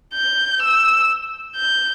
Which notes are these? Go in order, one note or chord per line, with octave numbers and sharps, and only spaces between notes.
G6
E6
G6